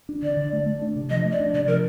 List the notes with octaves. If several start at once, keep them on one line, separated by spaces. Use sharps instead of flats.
D4
D3 D5
D3
A3
A3
D4
C3
F3 D#5
A3
D5
D4
C3 D5
F3 A#4